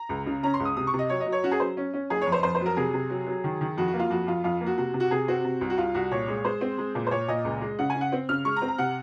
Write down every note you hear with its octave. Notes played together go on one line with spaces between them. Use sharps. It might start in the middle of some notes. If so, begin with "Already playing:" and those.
Already playing: A#5
C#2
C#3
C#4 A#5
C6
C#2
D#6
C3 D#6
C#6
C3
D#5
F#3 C#5
D#5
F#3
C#5
C#4 F#4
G#4
F#3 C5
C#4
C#4
F#1 G#4
F2 C#5
C5
F2 C5
C5
F#3
A#4
C3 G#4
C3
F#3
F#3
D#3
D#3
F2 F#4
F#4
A#3
F4
F2 F#4
F2 F4
F2 F4
A#3
F#4
C3 F#4
C3
F#4
C3 G#4
C4 F#4
C3
C2
F#4
C2 F4
C2 F#4
A#2 C#5
G#3
G#3 C5
C4
G#3
A#2
C5
A#2 C#5
A#2 D#5
C#2
G#3
C#3 F#5
C#3 G#5
F#5
C4
C#3 F6
G#3 C#6
A#5
C4
A#5
C3 F#5